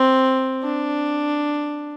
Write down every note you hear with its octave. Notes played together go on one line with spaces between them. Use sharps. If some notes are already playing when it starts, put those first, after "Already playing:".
Already playing: C4
D4